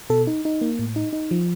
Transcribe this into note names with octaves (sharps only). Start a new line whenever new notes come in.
B2 A4
D#4
D#4
A#3
A2
D#4
D#4
F3